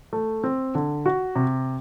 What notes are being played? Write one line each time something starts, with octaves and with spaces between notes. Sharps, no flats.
A3
C4
D3
F#4
C3